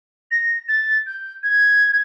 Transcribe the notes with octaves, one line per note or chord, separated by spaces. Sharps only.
A#6
A6
G6
G#6